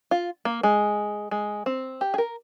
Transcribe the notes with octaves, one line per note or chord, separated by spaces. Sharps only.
F4
A#3
G#3
G#3
C4
G4
G#4
A#4